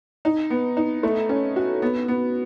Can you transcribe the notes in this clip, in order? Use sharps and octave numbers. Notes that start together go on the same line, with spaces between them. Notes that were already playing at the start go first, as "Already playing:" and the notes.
D#4
B3
D#4
A3
C#4
F#4
B3
B3